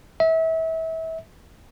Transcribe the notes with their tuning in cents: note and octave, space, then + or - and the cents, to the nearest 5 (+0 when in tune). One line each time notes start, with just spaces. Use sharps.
E5 -30